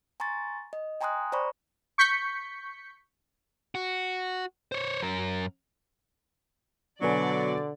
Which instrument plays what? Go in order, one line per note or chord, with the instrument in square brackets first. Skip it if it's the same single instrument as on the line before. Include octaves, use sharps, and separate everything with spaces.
[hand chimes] G#5 A#5 C6 C#6 A6
D#5
G5 G#5 A#5 C6 D#6 F#6
C5 D5 A#5 B5 C#6
[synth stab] C#6 G6 B6 C#7
[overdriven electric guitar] F#4
C5 C#5
F#2 A#4
[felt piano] B2 B4 G#5 [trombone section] D3 [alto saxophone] F#3 [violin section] D5